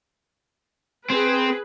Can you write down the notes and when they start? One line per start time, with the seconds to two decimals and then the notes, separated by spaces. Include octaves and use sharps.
1.10 C4 G#4 B4